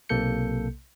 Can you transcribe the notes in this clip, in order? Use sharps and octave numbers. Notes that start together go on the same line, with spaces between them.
B1 C3 A#3 A4 G6 C#7